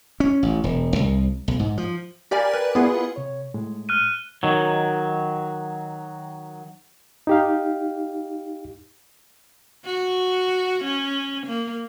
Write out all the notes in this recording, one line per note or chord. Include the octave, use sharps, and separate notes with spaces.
C#4
A1
E1
C2
B1
G#2
F3
G4 A#4 D5 F5 G#5 B5
B4
B3 E4 F4 G#4 B4
C3 C#5
A2 G#3
F6 F#6 D#7
D#3 F#3
D#4 G4 F5
F#4
C#4
A#3